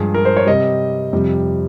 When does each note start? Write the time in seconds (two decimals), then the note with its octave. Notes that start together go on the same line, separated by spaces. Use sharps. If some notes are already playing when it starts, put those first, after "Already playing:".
Already playing: G2 F3 G#3 G#4
0.14 A#4
0.25 C5
0.37 C#5
0.47 C3 G3 D#5
1.13 F2 C3 G3